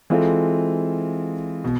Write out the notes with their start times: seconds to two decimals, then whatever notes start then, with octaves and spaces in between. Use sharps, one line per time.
0.10 E3 G#3 C4 F4 A4
1.64 B2